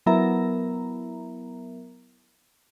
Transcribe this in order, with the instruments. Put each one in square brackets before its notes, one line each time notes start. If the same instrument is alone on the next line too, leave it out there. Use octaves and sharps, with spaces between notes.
[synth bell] F#3 B3 E4 A#4 E5 A#5